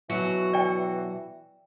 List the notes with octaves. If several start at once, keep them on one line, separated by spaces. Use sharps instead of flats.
B2 E3 F#3 F#4
D5 G5